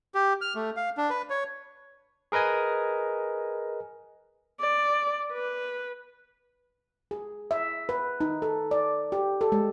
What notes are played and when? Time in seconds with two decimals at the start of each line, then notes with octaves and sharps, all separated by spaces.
0.15 G4
0.41 F6
0.55 A3
0.77 F5
0.97 D4
1.10 B4
1.30 C#5
2.32 G#4 A#4 B4 D#5 G#5
4.60 D5
5.32 B4
7.11 G#4
7.51 E5
7.89 B4
8.21 D#4
8.42 A4
8.71 D5
9.12 G4
9.41 A4
9.52 G#3